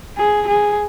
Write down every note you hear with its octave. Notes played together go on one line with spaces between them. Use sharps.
G#4
G#4